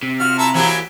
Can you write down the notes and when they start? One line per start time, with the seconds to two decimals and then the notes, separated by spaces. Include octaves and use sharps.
0.03 C3
0.20 F4 F#4 F6
0.38 E4 A4 A#5 E6
0.54 E3 F#3 A#3 E4 G4 G#5